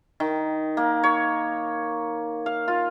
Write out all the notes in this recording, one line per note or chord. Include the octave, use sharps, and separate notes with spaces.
D#3
A#3
C#5
F5
F4